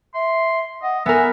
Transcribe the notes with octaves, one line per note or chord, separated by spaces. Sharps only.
E5 C6
D#5 F#5
B3 A#4 E5 G#5